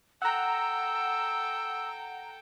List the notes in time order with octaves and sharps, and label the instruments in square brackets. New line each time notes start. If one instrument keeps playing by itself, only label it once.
[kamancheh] A4 G5 [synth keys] F#5 A#5 [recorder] E6